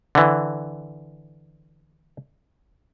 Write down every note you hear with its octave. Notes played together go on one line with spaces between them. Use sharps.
D3 E3